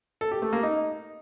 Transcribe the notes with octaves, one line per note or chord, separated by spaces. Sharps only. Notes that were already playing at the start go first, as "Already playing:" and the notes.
A4
G4
A3
A#3
D#4